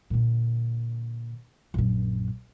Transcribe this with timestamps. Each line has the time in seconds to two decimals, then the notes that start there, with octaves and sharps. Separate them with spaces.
0.10 A#2 D3
1.74 A#1 F#2